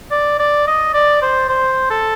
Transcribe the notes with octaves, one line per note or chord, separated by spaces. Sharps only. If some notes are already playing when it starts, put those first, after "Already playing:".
D5
D5
D#5
D5
C5
C5
A4